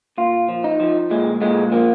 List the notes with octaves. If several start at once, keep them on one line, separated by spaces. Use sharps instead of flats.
A#2 F4
F3
D#4
F3
A#2 G#3
A#2 G#3
F3 A#3